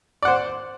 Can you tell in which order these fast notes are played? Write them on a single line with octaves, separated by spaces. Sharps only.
D5 F#5 C5